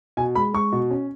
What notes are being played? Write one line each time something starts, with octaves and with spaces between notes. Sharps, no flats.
B2 G#5
G#3 B5
G#3 C#6
B2
C#4